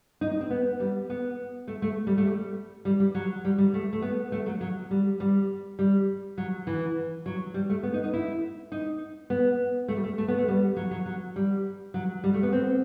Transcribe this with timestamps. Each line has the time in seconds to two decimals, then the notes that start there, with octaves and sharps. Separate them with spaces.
0.21 D#4
0.31 D#4
0.41 C4
0.50 B3
0.80 G3
1.10 B3
1.68 A3
1.82 A3
2.07 G3
2.18 A3
2.27 G3
2.85 G3
3.00 G3
3.15 F#3
3.45 G3
3.58 G3
3.74 A3
3.93 A3
4.02 B3
4.32 A3
4.46 F#3
4.61 F#3
4.91 G3
5.20 G3
5.79 G3
6.38 F#3
6.67 E3
7.26 F#3
7.54 G3
7.70 A3
7.83 B3
7.94 D#4
8.04 D#4
8.13 E4
8.72 D#4
9.30 B3
9.88 A3
9.96 G3
10.04 A3
10.18 A3
10.28 B3
10.38 A3
10.48 G3
10.77 F#3
10.91 F#3
11.06 F#3
11.36 G3
11.94 F#3
12.24 G3
12.34 A3
12.43 B3
12.52 C4